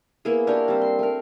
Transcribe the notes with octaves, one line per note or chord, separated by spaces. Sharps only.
A#3 B3 E4 G#4
D4 G4 A#4 C#5
G3 C4
C6
A3 A#4